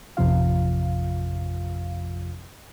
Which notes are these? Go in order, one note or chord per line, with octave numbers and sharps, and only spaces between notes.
A1 F2 C3 F3 F4 F5